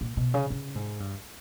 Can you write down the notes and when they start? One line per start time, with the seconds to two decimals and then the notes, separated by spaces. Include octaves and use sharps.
0.01 A#2
0.17 B2
0.34 C#3
0.50 C#3
0.75 G#2
1.00 G2